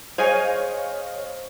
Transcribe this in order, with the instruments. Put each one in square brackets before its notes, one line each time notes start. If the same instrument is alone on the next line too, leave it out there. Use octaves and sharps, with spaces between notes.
[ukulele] G#4 G#5 [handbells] C5 [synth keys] C#5 D#5 F5